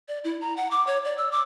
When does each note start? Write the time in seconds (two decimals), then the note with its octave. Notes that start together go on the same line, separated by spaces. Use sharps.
0.08 D5
0.24 E4
0.41 A#5
0.57 F#5
0.71 D6
0.87 C#5
1.05 D5
1.18 E6
1.32 D6